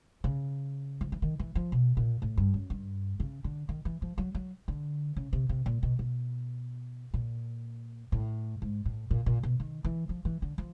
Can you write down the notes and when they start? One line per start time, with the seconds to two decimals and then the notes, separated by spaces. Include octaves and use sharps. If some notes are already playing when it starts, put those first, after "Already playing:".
0.24 C#3
1.01 F3
1.12 E3
1.22 D#3
1.39 E3
1.55 F3
1.72 B2
1.97 A#2
2.22 A2
2.38 G2
2.54 F#2
2.70 G2
3.20 C#3
3.44 D3
3.69 D#3
3.85 E3
4.02 F3
4.18 F#3
4.35 F#3
4.68 D3
5.17 C#3
5.33 C3
5.49 C3
5.66 A#2
5.83 B2
5.99 B2
7.14 A#2
8.12 A2
8.62 G#2
8.86 A2
9.11 A#2
9.26 A#2
9.43 B2
9.60 D#3
9.85 E3
10.09 F3
10.25 E3
10.42 D3
10.58 F3